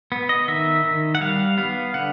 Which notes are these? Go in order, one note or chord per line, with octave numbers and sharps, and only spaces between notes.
B3
D#5
D#3 E5
D#3
F#5
G3 F5
B3 F5
D3 F#5